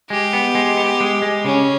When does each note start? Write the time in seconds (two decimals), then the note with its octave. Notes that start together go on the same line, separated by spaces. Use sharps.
0.10 G#3 G4
0.33 B3
0.55 G#3
0.77 B3
1.00 G#3
1.22 G#3
1.44 C#3 C#4